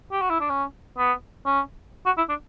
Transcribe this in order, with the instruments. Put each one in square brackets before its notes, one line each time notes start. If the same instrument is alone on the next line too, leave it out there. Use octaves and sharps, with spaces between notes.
[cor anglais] G4
F#4
E4
D4
C#4
B3
C#4
F#4
E4
D4